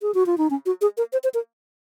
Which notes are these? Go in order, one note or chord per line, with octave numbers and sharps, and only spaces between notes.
G#4
F#4
F4
D#4
C#4
F#4
G#4
A#4
C5
C5
A#4